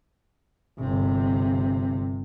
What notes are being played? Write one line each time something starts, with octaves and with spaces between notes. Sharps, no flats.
G1 C3